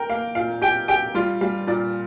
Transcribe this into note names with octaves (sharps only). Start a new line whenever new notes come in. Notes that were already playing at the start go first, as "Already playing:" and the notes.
Already playing: A#4 G5 A#5
A#3 F5
A#2 F5
G4 G5
G4 G5
G3 F4
G3 F5
A#2 D5